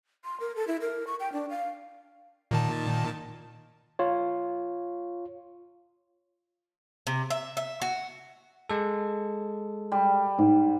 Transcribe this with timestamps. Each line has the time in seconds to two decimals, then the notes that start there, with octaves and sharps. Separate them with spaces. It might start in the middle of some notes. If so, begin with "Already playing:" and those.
0.25 C6
0.40 A#4
0.56 A4
0.68 E4
0.81 A#4
1.07 C#6
1.20 G5
1.33 D4
1.50 F5
2.51 A#2 D#3 A5
3.99 F4 C#5
7.07 C3
7.30 E5
7.57 E5
7.82 F#4
8.69 G#3 A4
9.92 G3
10.38 G#2